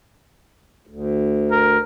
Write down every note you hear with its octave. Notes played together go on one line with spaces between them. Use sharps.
D2
A#4